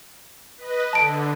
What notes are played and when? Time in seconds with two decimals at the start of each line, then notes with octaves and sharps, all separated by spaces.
0.58 B4 D#5
0.93 D3 A5 D7